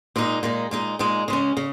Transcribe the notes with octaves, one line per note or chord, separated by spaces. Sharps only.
A#2 G#3 D#4
A#2 G#3 D#4
A#2 G#3 D#4
A#2 G#3 D#4
C#3 G#3 C#4
C#3